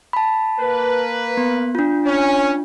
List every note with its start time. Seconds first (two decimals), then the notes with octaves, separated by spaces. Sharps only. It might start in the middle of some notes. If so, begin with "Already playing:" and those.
0.13 A5 B5
0.60 A#3 B4
1.37 B3
1.75 D4 F4
2.05 C#4